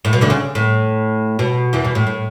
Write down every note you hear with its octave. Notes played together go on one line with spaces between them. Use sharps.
A2
B2
D2 D3
C#3
A2
B2
E2 E3
B2
A2
A2